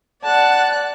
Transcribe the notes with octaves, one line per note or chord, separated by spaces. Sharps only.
D5 F#5 A5 F#6